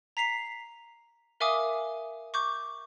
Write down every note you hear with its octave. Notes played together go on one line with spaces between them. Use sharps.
A#5 B6 C7 F7
A#4 E5 F5 G#5 D6 D#6
C#6 D6 G6